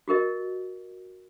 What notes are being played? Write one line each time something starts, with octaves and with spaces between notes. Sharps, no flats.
F#4 G4 A#4 D#5